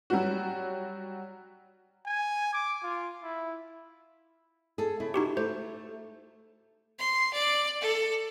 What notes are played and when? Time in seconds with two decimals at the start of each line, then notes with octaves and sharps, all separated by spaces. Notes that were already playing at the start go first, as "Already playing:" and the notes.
0.10 F#3 G3 F#4
2.06 G#5
2.53 D6
2.83 F4
3.23 E4
4.78 G#4 A4
5.00 C#3 E4
5.14 D#4 F#4 G4
5.37 A3 C5
6.98 C6
7.33 D5
7.81 A4